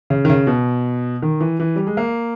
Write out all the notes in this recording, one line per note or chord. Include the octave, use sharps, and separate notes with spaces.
C#3
D#3
C#3
B2
D#3
E3
E3
G3
G#3
A#3